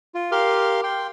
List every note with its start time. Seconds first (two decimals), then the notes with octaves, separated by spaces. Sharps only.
0.15 F4
0.32 G4 A#4 F5 C6 F6
0.83 G5 C6